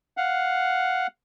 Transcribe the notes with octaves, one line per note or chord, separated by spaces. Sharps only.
F5 F#5